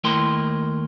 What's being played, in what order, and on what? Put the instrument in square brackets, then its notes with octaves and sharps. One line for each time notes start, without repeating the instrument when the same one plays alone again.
[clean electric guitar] D#2 A3 E4 A#4 G5 C6